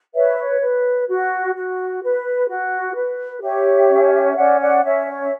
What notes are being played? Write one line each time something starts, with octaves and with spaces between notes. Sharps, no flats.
B4 C#5 E5
C#5
B4
F#4
F#4
B4
F#4
B4
G4 C#5 E5
C#4
C#4 D5 F#5
D5 F#5
C#4 C#5 E5
C#5
E5